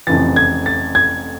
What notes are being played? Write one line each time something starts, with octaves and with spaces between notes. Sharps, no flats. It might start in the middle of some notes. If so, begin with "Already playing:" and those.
F1 F2 C#3 E3 A6
G#6
A6
G#6